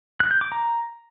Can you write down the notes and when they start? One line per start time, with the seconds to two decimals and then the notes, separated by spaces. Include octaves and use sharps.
0.20 F#6
0.31 G6
0.41 D6
0.52 A#5